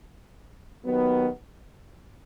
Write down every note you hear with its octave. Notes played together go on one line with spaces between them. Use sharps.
D#2 D#3 F#3 B3